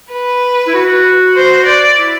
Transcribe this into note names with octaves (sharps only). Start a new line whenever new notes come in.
B4
E4
F#4
C5
D5
E4